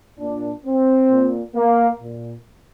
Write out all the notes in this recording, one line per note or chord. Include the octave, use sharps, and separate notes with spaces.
A#2 D4
C4
A#2
A#3
A#2